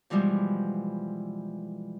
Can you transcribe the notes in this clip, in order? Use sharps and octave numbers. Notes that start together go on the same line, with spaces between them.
B2 E3 F3 G3 G#3